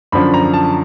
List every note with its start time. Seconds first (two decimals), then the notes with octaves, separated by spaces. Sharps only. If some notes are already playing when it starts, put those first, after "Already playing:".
0.12 F#2 D3 F3 B5
0.34 A#5
0.54 A5